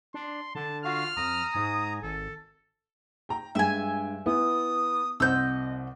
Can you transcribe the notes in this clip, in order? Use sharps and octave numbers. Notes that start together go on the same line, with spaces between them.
D4 C6
D3 A5
F4 F#4 F5 F6
F2 A#5 D#6
G#2 G#5
G#1 A4
G5 A#5
G2 G#3 E5 G5 G#5
B3 E4 D#6
C2 C5 D#5 F#5 E6 G6